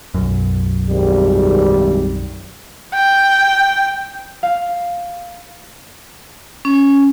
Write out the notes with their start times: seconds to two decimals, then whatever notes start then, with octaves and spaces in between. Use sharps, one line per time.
0.14 B1 F#2
0.89 G#1 G3
2.94 G5
4.43 F5
6.65 C#4